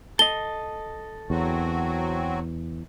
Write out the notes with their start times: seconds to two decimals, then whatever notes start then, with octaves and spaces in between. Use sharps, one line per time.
0.19 A4 D#5 G7
1.30 E2 F#3 C4 F#4